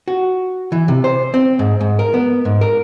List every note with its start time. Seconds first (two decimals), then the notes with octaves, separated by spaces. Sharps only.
0.08 F#4
0.72 E3
0.88 C3
1.04 C5
1.34 C4
1.59 G#2
1.81 G#2
1.99 A#4
2.14 B3
2.45 G#2
2.61 A#4